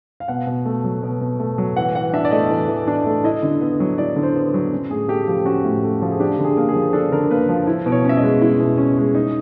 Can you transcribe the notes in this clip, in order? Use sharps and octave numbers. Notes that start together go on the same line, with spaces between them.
F5
B2 F#5
B2
A3
F#3
B2
B2
A3
F#3
E3 F#5
E3 F#5
D4 E5
D5
A3 D#5
E3
E3
D4
A3
E4 D#5
D3
B3
F#3
E4 D5
D3
C5
B3
F#3
C#4
A2 G#4
A3 G4
F3 G4
C#4 F#4
A2
A3
F3
G#4
D4 G4
D3
G#4
A#3
G#4
F3
D4 A4
D3 A#4
A#3 B4
F3
E4
B2
C#5
C#4 E5
D#5
G#3
E4
B2
C#4
G#3
D#4